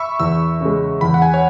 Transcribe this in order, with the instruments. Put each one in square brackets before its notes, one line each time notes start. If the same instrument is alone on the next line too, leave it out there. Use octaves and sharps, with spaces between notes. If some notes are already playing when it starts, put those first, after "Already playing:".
Already playing: [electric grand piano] E5 B5 C#6 E6
[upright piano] E2 [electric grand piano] E6
[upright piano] C#3 G#3
[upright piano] E2 [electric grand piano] B5
[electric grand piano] F#5
G#5
C#5